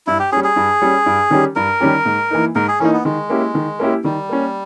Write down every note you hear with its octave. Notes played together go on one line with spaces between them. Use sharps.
G2 E4
G4
G3 C#4 G#4
G#4
G2
G3 C#4
G2
D#3 G3 C#4 G4
G2 A#4
D#3 G3 C#4 G4
G#2
E3 A#3 D#4
G#2 A#4
G#4
E3 A#3 C#4 D#4
B3
D#3 G#3
A#3 C#4 E4 G4
D#3
A#3 C#4 E4 G4
D#3 G3
A#3 C#4